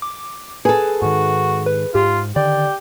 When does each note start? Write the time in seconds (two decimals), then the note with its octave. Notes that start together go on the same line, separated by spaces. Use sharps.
0.02 D6
0.65 G#4 A4 B4
1.02 G#2 D#3 F#4
1.66 B4
1.95 G#2 F4 G4
2.36 D3 D#3 G4 D5